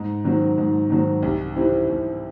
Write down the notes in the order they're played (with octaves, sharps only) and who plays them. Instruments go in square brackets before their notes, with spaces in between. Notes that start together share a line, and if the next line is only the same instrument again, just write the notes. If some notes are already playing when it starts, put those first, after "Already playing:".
Already playing: [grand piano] G#2
D#3 F#3 C4
G#2
D#3 F#3 C4
C2
C3 E3 C4 E4
C2